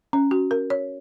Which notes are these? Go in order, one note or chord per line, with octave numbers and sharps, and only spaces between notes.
C#4
F#4
A#4
C#5